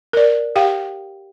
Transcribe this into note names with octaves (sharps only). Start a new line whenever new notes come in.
A#4 D5
G4 F5 G5